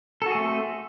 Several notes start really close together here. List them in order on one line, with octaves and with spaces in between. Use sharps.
A4 F#4 G#4 A3 C4